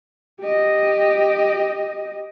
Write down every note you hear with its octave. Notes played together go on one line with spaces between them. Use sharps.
G4 D#5